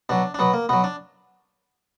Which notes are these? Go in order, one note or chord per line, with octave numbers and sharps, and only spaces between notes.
B2 F#3 D4
D4
B2 F#3 B3
A#3
B2 F#3 B3
D4